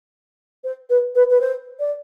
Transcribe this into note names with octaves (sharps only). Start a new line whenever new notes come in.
C5
B4
B4
B4
C5
D5